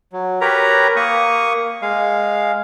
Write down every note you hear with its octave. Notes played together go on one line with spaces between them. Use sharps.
F#3
G4 A#4 B4 C#5 A#5
A#3 C#6 D#6
G#3 F5